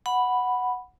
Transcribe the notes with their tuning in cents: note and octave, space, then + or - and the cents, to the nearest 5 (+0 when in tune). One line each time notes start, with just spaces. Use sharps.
F#5 +0 B5 +0